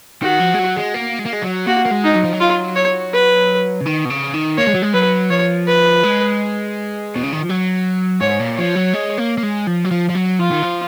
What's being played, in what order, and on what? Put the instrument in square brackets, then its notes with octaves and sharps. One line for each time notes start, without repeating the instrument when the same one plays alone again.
[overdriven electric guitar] D#3 [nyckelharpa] F#4
[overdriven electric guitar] F3
G#3
F#3
G#3
A#3
G#3
A#3
G#3
F#3
[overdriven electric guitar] A#3 [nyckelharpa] F#4
[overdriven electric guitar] A#3
G#3
[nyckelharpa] D#4
[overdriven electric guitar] F#3
F3
F#3
[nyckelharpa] F4
C#5
B4
[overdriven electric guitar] C#3
D#3
B2
C#3
D#3
[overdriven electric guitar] A#3 [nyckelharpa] C#5
[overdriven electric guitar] G#3
F#3
G#3
[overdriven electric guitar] F#3 [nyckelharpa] B4
[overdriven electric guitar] F3 [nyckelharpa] C#5
[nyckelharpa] B4
[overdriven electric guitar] G#3
B2
C#3
D#3
F3
F#3
[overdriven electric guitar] G#2 [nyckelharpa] C#5
[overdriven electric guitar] A#2
[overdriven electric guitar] F3 [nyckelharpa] C#5
[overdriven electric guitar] F#3
G#3
A#3
A#3
G#3
F3
F#3
F3
F3
F#3
[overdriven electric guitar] F3 [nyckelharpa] F4
[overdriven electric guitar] D#3
F3